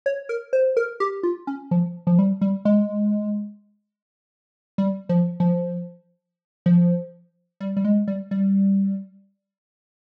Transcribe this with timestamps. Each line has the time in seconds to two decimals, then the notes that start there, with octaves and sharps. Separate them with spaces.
0.06 C#5
0.29 A#4
0.53 C5
0.77 A#4
1.00 G4
1.23 F4
1.47 C#4
1.71 F3
2.07 F3
2.19 G3
2.41 G3
2.65 G#3
4.78 G3
5.09 F3
5.40 F3
6.66 F3
7.60 G3
7.77 G3
7.85 G#3
8.08 G3
8.31 G3